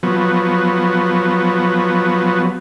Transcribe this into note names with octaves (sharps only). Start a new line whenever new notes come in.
F3 F#3 B3